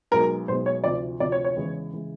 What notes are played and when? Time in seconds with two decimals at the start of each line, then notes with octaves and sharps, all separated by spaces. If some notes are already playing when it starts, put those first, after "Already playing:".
0.11 B1 B2 G#3 A#4
0.48 B1 B2 G#3 C5
0.66 C#5
0.84 D2 C3 F3 D5
1.20 D2 C3 F3 D5
1.32 C#5
1.44 C#5
1.56 E2 C#3 E3 G#3
1.93 C#3 E3 G#3